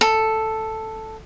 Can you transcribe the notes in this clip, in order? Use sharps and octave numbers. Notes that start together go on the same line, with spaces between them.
A4